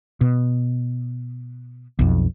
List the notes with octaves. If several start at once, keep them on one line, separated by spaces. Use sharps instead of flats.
B2
B1 F2